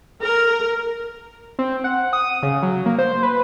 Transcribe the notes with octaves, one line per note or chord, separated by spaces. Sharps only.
A#4
C4
F#5
D#6
C#3
F#3
A#3
C5
B4